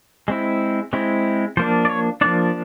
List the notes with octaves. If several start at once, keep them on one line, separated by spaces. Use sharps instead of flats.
G#3 C4 E4
G#3 C4 E4
F3 A#3 D4 C5
D5
C#5
F3 A#3 D4 D5